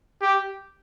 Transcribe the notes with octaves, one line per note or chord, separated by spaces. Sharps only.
G4